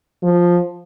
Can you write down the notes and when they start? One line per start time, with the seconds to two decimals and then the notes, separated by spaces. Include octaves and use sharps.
0.23 F3